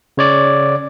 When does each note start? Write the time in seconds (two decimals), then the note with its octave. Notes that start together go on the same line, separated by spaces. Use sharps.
0.17 C#3 C#5 D5